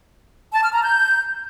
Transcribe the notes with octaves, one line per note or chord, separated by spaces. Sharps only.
A5
F6
A#5
G6